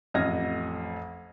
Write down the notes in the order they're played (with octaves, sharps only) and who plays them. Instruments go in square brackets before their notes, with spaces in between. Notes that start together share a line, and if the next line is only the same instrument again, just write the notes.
[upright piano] A1 F2 D#5 F6 G#6 A#6